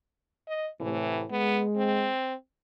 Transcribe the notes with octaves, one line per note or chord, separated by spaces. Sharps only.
D#5
A2 C3 E3
G#3 B3
C4